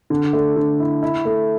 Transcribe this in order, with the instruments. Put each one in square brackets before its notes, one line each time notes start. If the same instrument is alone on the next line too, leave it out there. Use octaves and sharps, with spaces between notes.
[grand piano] D3
A3
D3
E4
E4
A3